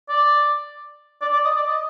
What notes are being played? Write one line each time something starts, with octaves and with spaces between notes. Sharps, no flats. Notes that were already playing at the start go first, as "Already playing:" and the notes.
D5
D5
D5
D#5
D5
D#5